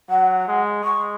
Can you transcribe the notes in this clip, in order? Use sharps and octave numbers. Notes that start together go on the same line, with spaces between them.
F#3 F#5
G#3
G#3 C#6